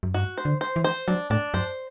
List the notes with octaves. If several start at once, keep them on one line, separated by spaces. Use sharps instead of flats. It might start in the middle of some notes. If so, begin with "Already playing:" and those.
F#2
G2 F#4
C5
D3
C5
E3
C5
F#3 D4
A2 D4
F#2 C5